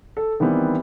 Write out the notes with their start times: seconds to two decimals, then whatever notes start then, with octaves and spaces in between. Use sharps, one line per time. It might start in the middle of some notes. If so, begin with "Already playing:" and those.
0.17 A4
0.40 D#3 E3 G3 B3 C4